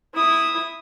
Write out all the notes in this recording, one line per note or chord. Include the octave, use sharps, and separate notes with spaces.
E4 D#6